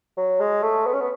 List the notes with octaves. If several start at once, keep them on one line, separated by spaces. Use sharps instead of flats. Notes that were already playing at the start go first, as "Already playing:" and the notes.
F#3
G#3
A3
B3
C#4
B3